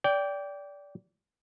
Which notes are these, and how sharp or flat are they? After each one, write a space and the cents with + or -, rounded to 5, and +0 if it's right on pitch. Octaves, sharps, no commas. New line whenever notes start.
D5 -25 G5 +0